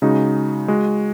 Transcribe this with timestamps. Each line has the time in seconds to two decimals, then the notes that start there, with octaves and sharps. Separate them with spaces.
0.02 C#3 G#3 D#4 F#4
0.68 G#3 F#4